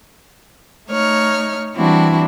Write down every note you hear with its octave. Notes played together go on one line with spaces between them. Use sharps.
A3 D#4 C#5 F6
E3 G3 C4 D4 E4 F#4